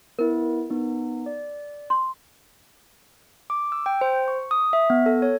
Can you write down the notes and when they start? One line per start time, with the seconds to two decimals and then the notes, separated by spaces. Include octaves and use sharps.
0.19 B3 E4 A#4
0.70 B3 D#4
1.26 D5
1.90 C6
3.50 D6
3.72 E6
3.86 G5
4.01 C5
4.28 C#6
4.51 D#6
4.73 E5
4.90 B3
5.06 A4
5.22 C#5